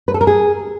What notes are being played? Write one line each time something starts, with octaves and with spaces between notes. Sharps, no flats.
B4
A4
A#4
G#4